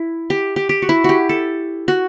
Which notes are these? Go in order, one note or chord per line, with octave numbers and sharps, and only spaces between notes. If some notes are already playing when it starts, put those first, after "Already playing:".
Already playing: E4
G4
G4
G4
F#4
E4
F#4 G4
A4
F#4